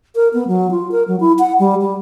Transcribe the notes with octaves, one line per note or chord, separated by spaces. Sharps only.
A#4
B3
F#3
F4
A#4
F#3
E4
F#5
G3
G3